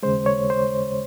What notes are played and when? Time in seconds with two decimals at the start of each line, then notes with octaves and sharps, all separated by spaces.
0.03 D#2 C#3 G#3 C5
0.26 C#5
0.50 C5